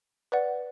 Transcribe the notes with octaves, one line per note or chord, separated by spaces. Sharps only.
B4 D5 F#5